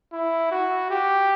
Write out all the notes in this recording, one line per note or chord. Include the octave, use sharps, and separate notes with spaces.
E4
F#4
G4